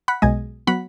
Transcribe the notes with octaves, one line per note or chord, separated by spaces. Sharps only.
F#5 B5
B1 B2 G#3 D#5 G#5
F#3 B3 F#5 B5